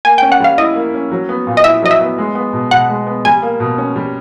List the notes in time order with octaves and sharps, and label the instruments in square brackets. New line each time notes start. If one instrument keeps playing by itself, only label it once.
[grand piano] A#3 [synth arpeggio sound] G#5
[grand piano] C#4 [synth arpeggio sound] G5
[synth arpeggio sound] F#5
[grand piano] G3 [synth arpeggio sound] F5
[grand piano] E4 [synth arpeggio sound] D#5
[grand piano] A#3
C#4
F#3
B3
A#2
[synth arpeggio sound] D#5
[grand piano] E4 [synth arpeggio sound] E5
[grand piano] F#3 [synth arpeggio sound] D#5
[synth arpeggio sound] E5
[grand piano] B3
G#3
B3
B2
[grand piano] B2 [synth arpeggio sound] F#5
[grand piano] G#3
B3
[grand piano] G3 [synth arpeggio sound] G#5
[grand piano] A#3
B2
C#4
G3